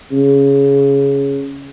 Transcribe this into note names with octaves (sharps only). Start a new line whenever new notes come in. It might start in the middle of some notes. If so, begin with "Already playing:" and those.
C#3